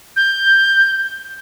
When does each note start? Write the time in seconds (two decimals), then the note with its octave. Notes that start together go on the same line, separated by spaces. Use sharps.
0.16 G6